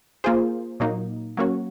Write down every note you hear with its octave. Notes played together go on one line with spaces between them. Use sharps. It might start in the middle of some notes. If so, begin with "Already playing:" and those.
A#3 F4 G#4 C5
A#2 F#3 A#3 D#4
F#3 A#3 C#4 F#4 C#5